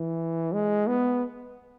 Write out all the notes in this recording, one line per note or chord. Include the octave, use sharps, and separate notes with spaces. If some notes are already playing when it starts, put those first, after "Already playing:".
Already playing: E3
G#3
B3